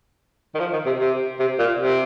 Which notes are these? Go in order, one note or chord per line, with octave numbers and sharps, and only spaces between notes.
D#3
F3
D#3
C3
C3
C3
A#2
C3